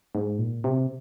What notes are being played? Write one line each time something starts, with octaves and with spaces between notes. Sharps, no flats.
G#2
A#2
C3